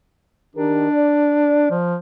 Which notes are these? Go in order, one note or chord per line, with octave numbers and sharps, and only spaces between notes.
D#3 D4 G4 A#4
D5
F3